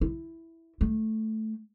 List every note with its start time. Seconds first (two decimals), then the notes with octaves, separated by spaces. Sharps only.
0.01 E4
0.81 A3